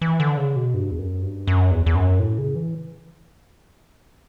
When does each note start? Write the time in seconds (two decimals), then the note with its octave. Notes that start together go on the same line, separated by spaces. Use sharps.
0.02 E3
0.20 D3
0.37 C#3
0.56 B2
0.74 G2
0.91 E2
0.98 F#2
1.22 G2
1.47 F#2
1.71 E2
1.86 E2
1.95 F#2
2.19 A2
2.38 C#3
2.56 E3